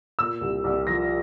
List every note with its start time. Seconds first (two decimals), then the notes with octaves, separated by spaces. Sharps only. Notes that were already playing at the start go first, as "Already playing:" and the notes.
0.19 A#2 E6
0.41 C2
0.64 C2
0.87 F3 A#6